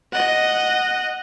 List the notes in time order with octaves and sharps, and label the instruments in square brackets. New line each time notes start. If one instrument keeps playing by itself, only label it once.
[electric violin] D#5 F#5